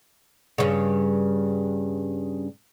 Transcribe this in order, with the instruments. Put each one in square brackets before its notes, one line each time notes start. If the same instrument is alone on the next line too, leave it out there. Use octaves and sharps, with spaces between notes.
[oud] G2 C#3